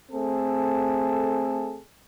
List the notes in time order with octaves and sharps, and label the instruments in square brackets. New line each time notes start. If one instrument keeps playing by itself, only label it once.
[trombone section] A3 C4 G#4 A4